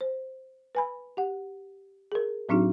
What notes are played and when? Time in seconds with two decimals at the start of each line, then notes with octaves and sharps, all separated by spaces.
0.01 C5
0.75 B4 G#5 B5
1.17 G4 F#5
2.12 G#4 A#4
2.49 A2 F#3 C4 D4 D#4 F#4